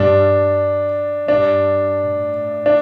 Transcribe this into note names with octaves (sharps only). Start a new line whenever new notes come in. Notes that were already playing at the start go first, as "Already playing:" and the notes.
Already playing: G2 D4
G2 D4
A2
D4